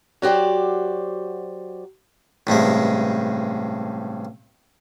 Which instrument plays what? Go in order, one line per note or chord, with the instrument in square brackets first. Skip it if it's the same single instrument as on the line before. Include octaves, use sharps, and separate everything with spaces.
[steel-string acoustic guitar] F#3 F#4 G4 C5 D5
[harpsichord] A1 G2 C3 G#3